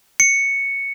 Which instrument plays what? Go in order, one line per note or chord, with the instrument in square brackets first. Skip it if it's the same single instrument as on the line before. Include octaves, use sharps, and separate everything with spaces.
[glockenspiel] C#7